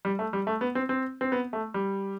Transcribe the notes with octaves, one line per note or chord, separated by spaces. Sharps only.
G3
A3
G3
A3
B3
C4
C4
C4
B3
A3
G3